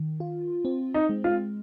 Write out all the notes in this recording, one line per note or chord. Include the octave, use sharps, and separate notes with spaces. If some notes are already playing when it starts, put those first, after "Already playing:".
Already playing: D#3
F4
C4
D#4
G#3
F4